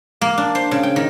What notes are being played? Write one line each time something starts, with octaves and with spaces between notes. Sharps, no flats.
A#3
D4
C5
C#3
G5
D#3